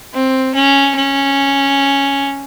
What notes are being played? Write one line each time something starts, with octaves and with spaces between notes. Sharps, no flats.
C4
C#4
C#4